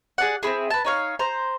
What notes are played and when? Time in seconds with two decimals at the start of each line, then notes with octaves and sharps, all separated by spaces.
0.18 G#4 D5 F#5
0.43 C4 C#4 E4 G#4
0.70 B4 A5
0.85 D#4 C#5 F5
1.19 C5 A#5